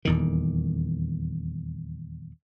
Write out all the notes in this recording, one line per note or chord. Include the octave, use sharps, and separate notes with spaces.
D#1 E2 D#3